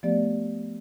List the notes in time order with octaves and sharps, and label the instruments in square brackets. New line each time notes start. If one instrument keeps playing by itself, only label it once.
[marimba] F3 A3 B3 G4 D5